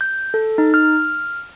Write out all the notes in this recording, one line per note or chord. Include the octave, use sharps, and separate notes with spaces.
G6
A4
D#4
F6